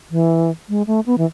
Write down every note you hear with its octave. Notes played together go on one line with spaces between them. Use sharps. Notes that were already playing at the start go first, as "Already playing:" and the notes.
E3
G#3
A3
B3
E3